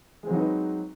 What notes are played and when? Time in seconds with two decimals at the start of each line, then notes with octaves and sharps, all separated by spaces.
0.23 G#3
0.27 C4
0.30 F#3
0.34 D#4
0.38 B4